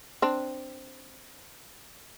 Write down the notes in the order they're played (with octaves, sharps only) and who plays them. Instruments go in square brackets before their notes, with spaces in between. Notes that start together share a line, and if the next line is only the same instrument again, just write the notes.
[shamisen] C4 D4